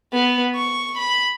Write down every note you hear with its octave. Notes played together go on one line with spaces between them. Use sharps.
B3
C#6
B5